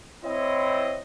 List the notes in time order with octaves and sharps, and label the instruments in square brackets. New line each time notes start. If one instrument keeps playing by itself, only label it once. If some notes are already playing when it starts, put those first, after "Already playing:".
[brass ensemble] C4 E4 C#5 D#5